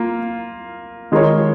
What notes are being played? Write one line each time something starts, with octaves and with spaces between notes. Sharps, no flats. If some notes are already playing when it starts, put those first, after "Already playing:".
Already playing: A#3 F4
D#3 G#3 F4 A#4 C#5